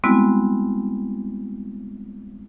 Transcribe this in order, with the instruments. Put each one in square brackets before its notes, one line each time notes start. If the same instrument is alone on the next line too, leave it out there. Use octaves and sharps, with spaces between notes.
[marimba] G3 G#3 B3 C4 E4 F#4